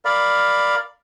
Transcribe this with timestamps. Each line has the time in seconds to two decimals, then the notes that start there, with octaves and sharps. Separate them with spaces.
0.05 A#4 D5 F5 B5